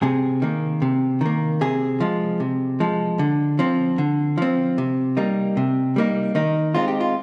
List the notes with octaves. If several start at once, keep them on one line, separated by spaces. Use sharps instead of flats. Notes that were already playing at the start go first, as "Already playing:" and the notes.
C3 G#4
D#3 A#3
C3
D#3 A#3
C3 G#4
F3 G#3
C3
F3 G#3
D3
F3 C4
D3
F3 C4
C3
G3 A#3 D#4
C3
G3 A#3 D#4
D#3 D#4
G#3 C4 D#4 F4
G4
F4